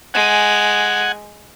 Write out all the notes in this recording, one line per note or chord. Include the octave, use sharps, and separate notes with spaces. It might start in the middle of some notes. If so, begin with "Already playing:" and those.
G#3 F#5 G#5